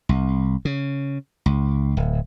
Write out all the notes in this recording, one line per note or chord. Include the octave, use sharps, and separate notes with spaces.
C2
C#3
C#2
D1